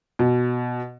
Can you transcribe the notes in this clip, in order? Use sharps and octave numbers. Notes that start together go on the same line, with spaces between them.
B2